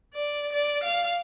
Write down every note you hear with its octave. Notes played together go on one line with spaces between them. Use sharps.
D5
D5
F5